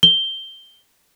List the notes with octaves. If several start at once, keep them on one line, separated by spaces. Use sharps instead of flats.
G7